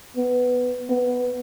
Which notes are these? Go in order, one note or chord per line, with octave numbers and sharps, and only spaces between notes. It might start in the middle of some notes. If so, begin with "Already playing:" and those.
B3
B3